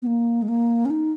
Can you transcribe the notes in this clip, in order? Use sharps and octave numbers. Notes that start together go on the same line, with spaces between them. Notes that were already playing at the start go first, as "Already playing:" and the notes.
B3
A#3
G#3
A#3
C#4
D#4